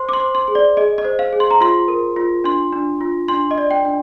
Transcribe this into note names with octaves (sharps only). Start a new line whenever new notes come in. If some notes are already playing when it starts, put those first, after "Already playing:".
Already playing: C5 C6
D6
C6
C5
C6
G#4
D5
G#4 D#5
D#5
C5
F5
G#4
C6
A#5
F4 C6
A#4
F4
D4 C6
D4
F4
D4 C6
D#5
D5
G5
D4